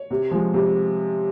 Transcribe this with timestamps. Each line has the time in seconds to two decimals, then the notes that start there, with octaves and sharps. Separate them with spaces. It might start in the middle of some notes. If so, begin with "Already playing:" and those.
Already playing: C#5
0.10 C3
0.31 F3 G#3
0.54 C3